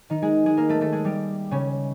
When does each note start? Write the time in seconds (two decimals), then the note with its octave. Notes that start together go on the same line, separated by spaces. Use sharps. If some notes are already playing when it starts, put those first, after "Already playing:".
0.10 D#3 D#4
0.22 G#3 G#4
0.46 G#3 G#4
0.57 A#3 A#4
0.69 A3 A4
0.81 A3 A4
0.92 G#3 G#4
1.05 G3 G4
1.51 C#3 C#4